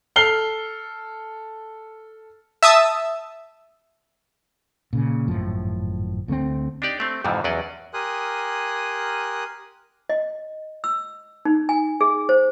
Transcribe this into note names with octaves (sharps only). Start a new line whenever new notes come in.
A4 F6 C7 G7
E5 A5 D#6 E6
A#2 C#3
G#1 F#2 A2 F3
D2 A3 A#3 C4
D4 D#4 G4 D5
A3 C4
F2 G#2 C3 E3 F3
E2 F#3 C#4 D5 D#5
G4 A#4 G#5 C6 D#6 F#6
D#5
E6
D#4
G#5
G#4
C5